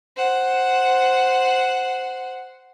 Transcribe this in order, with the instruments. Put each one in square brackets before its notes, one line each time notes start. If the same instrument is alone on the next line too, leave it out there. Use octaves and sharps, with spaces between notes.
[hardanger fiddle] C5 F#5